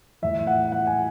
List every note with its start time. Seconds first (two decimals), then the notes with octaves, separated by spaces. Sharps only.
0.22 A2 E3 E5
0.47 F#5
0.72 F#5
0.87 G#5